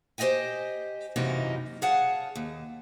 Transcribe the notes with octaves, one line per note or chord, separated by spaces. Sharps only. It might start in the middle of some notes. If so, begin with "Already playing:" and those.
G4 C5 D5 D#5 G5 G#5
F#2 C3 E3 A#3 D#4 E4
G#4 C#5 F5 F#5 A5
D#2